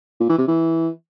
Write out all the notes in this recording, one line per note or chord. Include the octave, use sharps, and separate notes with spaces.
A#2
E3
C3
E3